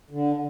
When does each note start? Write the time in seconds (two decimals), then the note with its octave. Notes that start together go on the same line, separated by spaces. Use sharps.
0.11 D3